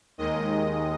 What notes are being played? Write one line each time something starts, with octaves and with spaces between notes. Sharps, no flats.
D#2 D#3 G#3 D#5